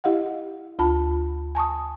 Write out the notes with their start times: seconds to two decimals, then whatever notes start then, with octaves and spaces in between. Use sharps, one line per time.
0.04 E4 G4 D#5 F5 F#5
0.79 D2 F4 A5 B5
1.55 G#5 A5 C#6 D#6